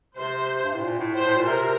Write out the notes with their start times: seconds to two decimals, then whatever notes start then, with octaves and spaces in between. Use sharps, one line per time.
0.17 C3 C5
0.64 G2
0.74 A2
0.83 A#2
0.99 A2
1.14 A2 C5
1.26 A2
1.37 A#2
1.47 C3 A#4